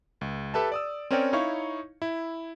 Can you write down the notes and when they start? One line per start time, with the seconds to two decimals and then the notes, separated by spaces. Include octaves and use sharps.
0.21 C#2
0.54 G4 A4 B4 E5 A5
0.72 D5 D#6 E6
1.11 C4 C#4 A#4 C#5 D5 G5
1.33 D#4 E4 C#5 F5 C#6
2.02 E4